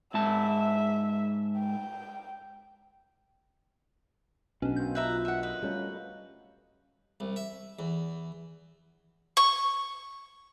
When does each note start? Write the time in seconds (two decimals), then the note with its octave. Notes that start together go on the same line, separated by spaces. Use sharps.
0.14 G#2 E5 A5
1.58 G5
4.62 B1 B2 C#4 D4
4.76 D#3 C4 F5 G6
4.95 F3 B4 E5 A#5
5.25 D3 D#3 C#4 E5 F#5
5.43 B4 D#5
5.62 B2 G3 A3 C#4 F5 A#5
7.20 C2
7.36 E5
7.79 E2
9.37 C#6